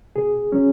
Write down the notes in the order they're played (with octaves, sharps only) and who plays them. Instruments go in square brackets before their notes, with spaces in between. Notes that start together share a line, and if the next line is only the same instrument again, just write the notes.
[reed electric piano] B2 G#4
F#3 C#4